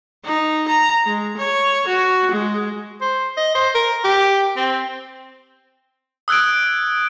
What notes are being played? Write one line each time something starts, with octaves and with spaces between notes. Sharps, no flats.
D#4
A#5
G#3
C#5
F#4
G#3
C5
D#5
C5
A#4
G4
C4
D#6 E6 F#6 G#6 D7